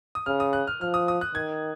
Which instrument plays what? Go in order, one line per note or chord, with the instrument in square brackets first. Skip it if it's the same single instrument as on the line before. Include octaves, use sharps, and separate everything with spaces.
[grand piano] D#6
[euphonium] C#3 [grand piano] F6
[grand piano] D#6
F#6
F6
[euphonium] F3 [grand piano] F6
[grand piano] D#6
D#6
F#6
[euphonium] D#3 [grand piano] G#6